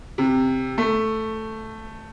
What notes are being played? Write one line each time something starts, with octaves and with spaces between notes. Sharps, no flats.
C3
A3